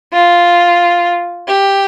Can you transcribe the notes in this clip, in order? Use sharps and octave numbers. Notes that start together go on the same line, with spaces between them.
F4
G4